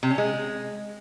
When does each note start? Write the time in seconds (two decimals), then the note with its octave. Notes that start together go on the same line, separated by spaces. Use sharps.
0.03 C3
0.10 C#4
0.18 G#3